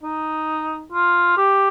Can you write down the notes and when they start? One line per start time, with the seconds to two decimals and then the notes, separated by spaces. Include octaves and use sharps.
0.03 D#4
0.92 F4
1.37 G4